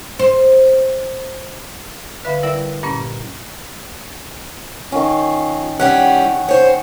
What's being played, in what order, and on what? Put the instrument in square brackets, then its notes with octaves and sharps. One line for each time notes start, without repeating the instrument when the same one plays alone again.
[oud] C5
[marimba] D3 B4 E5 F5 B5
G3 E4 A#4 D5 E5
G2 A#2 A#3 C#4
[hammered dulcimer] D#3 C#4 [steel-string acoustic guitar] F4
[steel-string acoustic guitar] G3 C#4 E4 [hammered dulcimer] F#5 G5
[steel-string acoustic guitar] C5 C#5